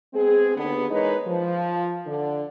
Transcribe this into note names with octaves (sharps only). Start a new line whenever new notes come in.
G#3 B3 C4 G#4
D#2 D3 B3
E3 G#3 D#4 A#4 B4 C#5
F3
D3